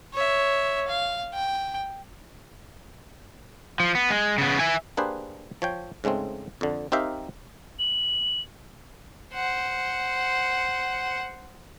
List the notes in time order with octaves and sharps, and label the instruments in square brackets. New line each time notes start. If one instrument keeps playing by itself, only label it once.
[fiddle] C#5 E5
F5
G5
[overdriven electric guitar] F3
B3
G#3
C#3 B3
E5 G#5
[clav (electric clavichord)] A#3 D4 G4 G#4 B4 C5
F3 C#5 G5
G#2 C#3 G#3 A3 C4
F2 D3
C4 D#4 G4 A#4 E5 F5
[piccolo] F#7
[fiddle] C5 F#5